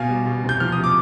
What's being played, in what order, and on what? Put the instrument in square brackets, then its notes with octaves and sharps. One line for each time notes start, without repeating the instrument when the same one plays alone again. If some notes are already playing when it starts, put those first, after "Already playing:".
Already playing: [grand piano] B2 B3 F5 G#5
G3
B2
C3
G6
F3 F6
D#6
C3
D6